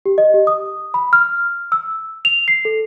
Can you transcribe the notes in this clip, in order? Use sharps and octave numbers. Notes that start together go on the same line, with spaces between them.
G4
D#5
G4
D#6
B5
F6
E6
F7
C7
A4